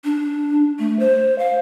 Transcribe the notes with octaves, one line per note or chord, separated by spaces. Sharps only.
D4
A3
C5
F5